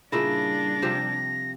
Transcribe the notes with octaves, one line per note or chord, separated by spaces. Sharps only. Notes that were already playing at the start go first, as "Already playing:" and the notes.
A#2 C#3 G3 D4 E4 A#6
C3 F3 G4